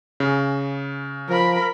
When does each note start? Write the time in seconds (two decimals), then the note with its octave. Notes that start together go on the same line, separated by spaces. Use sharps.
0.20 C#3
1.29 F3 A#4 B5